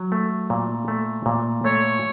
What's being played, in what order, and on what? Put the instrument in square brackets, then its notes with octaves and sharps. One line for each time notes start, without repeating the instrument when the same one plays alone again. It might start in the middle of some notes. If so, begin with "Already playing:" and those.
Already playing: [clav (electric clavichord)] F#3
A3
A#2
A3
A#2
[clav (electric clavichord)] A3 [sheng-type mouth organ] C#5